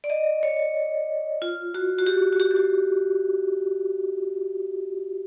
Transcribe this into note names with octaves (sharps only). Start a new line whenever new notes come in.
D5
D#5
C#5
F4
F#4
F#4
G4
F#4
G4
G4
F#4